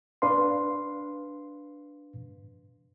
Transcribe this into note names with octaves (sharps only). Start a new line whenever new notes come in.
D4 B4 F5 C6